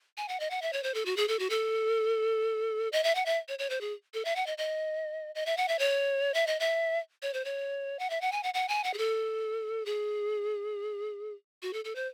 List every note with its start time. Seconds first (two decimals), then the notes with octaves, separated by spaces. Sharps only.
0.17 G#5
0.28 F#5
0.40 D#5
0.50 F#5
0.62 E5
0.73 C#5
0.83 C5
0.94 A4
1.06 F#4
1.17 G#4
1.28 A4
1.39 F#4
1.50 A4
2.92 D#5
3.04 E5
3.15 F#5
3.26 E5
3.48 C#5
3.59 C#5
3.70 C5
3.81 G#4
4.14 A4
4.25 E5
4.36 F#5
4.47 D#5
4.58 D#5
5.35 D#5
5.46 E5
5.57 F#5
5.68 E5
5.79 C#5
6.34 E5
6.47 D#5
6.60 E5
7.22 C#5
7.34 C5
7.45 C#5
7.99 F#5
8.10 E5
8.21 F#5
8.32 G#5
8.43 F#5
8.54 F#5
8.68 G#5
8.84 F#5
8.94 G#4
8.98 A4
9.86 G#4
11.62 F#4
11.73 A4
11.85 A4
11.95 C5